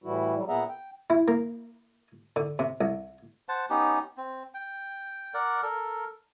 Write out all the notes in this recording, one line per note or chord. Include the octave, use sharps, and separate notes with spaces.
A2 E3 G3 E4 F#4
F#3 G3
A#2 B3 G#4 E5 F#5 A#5
G5
E4
A#3
D3
C3
C2
C5 F#5 A5
B3 C#4 D#4 G4
C4
G5
A#4 D5 F#5
A4 A#4